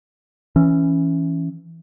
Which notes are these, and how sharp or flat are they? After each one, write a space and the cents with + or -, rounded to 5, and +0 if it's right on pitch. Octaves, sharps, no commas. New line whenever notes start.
E3 +0 C#4 +0